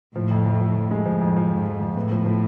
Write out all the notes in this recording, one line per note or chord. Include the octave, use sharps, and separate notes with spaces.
A2 F3
F2
F2
F3
F2
G#3
A2 F3
F2
F3
F2 G#2
F2
F2
A2 B3
F3
F3